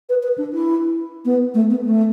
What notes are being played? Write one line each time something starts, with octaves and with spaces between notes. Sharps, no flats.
B4
B4
D4
E4
B3
A3
B3
A3